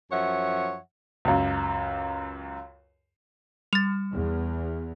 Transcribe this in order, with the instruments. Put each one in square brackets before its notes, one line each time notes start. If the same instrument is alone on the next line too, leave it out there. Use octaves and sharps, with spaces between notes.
[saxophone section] F#2 F3 C#5 E5 F#5
[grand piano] C#2 F#2
[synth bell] G3 [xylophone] A6 F7
[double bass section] E2